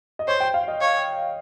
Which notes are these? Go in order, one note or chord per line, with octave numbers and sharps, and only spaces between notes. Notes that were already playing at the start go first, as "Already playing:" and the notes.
D#5
C5 C#5
G5
F5
D#5
C#5